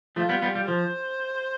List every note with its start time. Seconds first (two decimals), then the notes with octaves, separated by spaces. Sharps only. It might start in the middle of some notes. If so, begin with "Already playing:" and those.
0.16 F3 A3 F4
0.29 G3 B3
0.42 G3 B3
0.55 G3
0.68 F3 C5